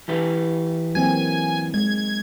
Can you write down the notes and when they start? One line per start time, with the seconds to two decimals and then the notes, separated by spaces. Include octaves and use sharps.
0.08 E3 G4 B4
0.95 F#3 A#3 C4 G#5
1.74 G#3 G#6